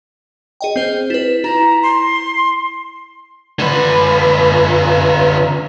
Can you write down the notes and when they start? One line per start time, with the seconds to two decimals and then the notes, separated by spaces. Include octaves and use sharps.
0.61 G#4 D#5 G5
0.76 C4 C5
1.10 E4 B4
1.44 E4 A#5
1.83 C6
3.59 D3 B4